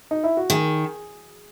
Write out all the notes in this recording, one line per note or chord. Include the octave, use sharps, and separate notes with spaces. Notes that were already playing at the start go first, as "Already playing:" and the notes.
D#4
E4
F#4
D#3 G#4